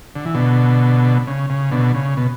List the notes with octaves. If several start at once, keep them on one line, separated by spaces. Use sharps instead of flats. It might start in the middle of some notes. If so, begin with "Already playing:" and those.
D3
E3
B2 D3
C#3
C#3
B2 D3
C#3
B2